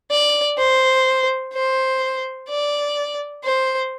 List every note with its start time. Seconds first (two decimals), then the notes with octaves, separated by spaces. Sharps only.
0.11 D5
0.58 C5
1.53 C5
2.49 D5
3.44 C5